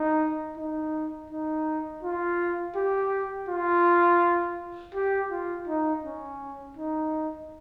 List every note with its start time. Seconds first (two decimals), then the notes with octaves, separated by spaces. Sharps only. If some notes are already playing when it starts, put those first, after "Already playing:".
Already playing: D#4
0.57 D#4
1.30 D#4
2.03 F4
2.76 G4
3.49 F4
4.95 G4
5.31 F4
5.68 D#4
6.04 C#4
6.77 D#4